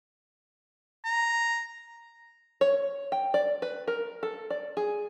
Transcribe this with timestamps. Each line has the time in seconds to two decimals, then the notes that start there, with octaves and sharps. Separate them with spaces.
1.05 A#5
2.61 C#5
3.12 G5
3.34 D5
3.62 B4
3.88 A#4
4.23 A4
4.50 D5
4.77 G#4